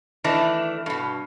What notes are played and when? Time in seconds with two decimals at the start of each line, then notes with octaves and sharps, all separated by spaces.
0.24 D#3 E3 A3 D4
0.86 G2 B2